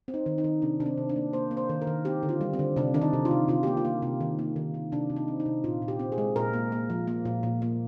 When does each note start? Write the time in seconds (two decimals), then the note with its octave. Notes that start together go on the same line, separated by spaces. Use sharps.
0.08 C4
0.14 D#4
0.26 D#3
0.38 D#4
0.44 D#3
0.62 C3 D4
0.80 C3 D4
0.86 C4
0.98 C3
1.09 D4
1.16 A#3
1.33 A#3 C5
1.51 A#3
1.57 C5
1.69 D#3
1.82 A#4
1.87 D#3
2.05 C4 G4
2.23 D3
2.29 F4
2.41 G3
2.54 C4
2.59 D3
2.76 C3 D4
2.94 D#3 D4
3.02 D#4
3.13 C3
3.25 F4
3.31 C3
3.48 C3 F4
3.63 A#3 G4
3.77 F4
3.85 A#3
4.02 C3
4.20 D#3
4.39 A#3
4.56 D#3
4.74 D#3
4.92 C3 D4
5.10 C3
5.16 D#4
5.28 C4
5.40 D#4
5.46 C3
5.64 A#2 F4
5.82 A#2
5.88 G4
5.99 C4
6.12 G#4
6.18 G#3
6.36 A#2 A#4
6.53 A#3
6.72 A#3
6.90 F3
7.07 A#3
7.25 A#2
7.43 A#2
7.62 A#3